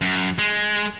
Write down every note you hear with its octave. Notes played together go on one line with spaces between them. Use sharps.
F#2
G#3